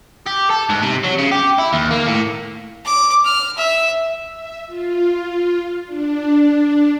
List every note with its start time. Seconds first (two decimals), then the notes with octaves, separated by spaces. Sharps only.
0.26 G4
0.50 A4
0.69 G#2
0.82 C3
1.03 F#3
1.18 C#3
1.31 G4
1.59 E4
1.73 D#2
1.91 A#3
2.06 A2
2.85 D6
3.25 F6
3.57 E5
4.29 E5
4.66 F4
5.86 D4